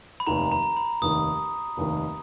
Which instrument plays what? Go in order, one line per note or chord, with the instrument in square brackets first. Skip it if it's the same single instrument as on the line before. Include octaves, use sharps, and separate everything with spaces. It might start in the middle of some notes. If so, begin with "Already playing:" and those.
[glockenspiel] B5
[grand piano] F1 D#2 D#3 [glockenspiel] A#5
[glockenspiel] A#5
B5
[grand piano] F1 D#2 D#3 [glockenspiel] D#6
[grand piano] F1 D#2 D#3